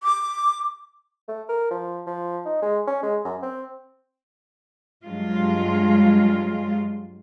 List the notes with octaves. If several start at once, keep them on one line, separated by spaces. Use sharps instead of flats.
D6
A3
A#4
F3
F3
D#4
G#3
C#4
G#3
F#2
C4
G2 F#3 G#3 F4